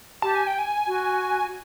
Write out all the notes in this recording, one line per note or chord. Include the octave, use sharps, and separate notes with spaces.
G4 A5
G#5
G5
G#5
F#4